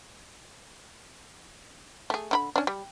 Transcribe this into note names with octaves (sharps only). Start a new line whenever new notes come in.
A3 G#4
D3 E4 B5
C#4 D4
G3